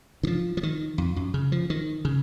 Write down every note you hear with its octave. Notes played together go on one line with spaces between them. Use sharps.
D#3
F3
F3
D#3
F2
F#2
C#3
F3
D#3
C#3